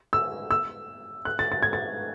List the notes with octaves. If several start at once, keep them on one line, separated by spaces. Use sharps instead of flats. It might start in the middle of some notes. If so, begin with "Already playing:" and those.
E6
E6
F#6
A6
A6
G#6
A6